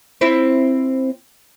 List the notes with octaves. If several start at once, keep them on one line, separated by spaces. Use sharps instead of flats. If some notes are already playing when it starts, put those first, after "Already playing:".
C4 E4